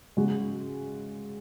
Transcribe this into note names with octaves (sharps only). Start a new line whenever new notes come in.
C#3 G#3 F#4